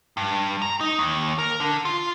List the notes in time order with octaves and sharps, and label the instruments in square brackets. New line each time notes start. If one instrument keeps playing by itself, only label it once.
[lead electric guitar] G2
A#5
D#4
D#2
A#4
D3
F4